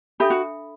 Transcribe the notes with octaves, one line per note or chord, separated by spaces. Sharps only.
D4 G4 A4 E5 B5
F#4